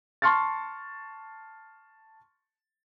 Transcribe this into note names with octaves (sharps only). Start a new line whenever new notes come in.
A5 C6 C#6 F6 A6